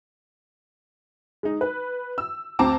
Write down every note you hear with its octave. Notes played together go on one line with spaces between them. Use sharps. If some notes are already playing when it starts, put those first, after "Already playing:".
G#3 D#4
B4
E6
D2 C4 A5 A#5 D6